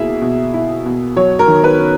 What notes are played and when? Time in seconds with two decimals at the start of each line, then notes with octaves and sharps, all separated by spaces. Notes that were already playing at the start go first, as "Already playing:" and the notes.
Already playing: B2 A#3 E4 G#4 E5
0.21 B2
0.54 E4
0.85 B2
1.16 F#3 C#5
1.39 A#4
1.48 D#3
1.64 B4
1.79 C#4